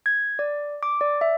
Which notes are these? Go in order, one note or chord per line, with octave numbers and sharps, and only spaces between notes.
G#6
D5
D6
D5
E5